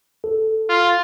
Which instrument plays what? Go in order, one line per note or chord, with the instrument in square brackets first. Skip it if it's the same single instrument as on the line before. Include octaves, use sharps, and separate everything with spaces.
[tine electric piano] A4
[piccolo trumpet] F4